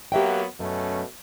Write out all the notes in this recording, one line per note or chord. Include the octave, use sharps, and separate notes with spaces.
F#3 A#3 B3 G4 E5 G5
F#2 B2 A3 C#4